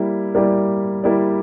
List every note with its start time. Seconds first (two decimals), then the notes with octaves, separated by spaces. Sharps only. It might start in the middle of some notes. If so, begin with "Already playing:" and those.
Already playing: G3 A#3 E4 G4
0.35 G3 A#3 E4 G4 D5
1.04 G3 A#3 E4 G4 D5